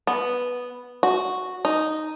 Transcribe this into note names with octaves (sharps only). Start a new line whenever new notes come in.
B3
F#4
D#4